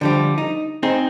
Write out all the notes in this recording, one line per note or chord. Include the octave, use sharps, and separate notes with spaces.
D3 F3 G3
D#4
C4 D#4 G#4